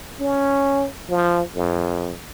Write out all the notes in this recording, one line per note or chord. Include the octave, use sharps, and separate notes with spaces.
C#4
F3
F2